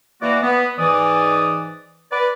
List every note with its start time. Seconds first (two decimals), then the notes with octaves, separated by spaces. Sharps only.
0.22 E3 A#3 F#4 D5
0.43 B3
0.78 G#2 E3 D5 D#6
2.11 B4 D5